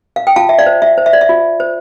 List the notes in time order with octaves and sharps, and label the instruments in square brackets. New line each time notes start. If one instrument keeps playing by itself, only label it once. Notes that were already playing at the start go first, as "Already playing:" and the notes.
[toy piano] F5
G5
F4 F5 A5
E5
D5 F5
C5
E5
C5
E5
D5
E5
F4
C5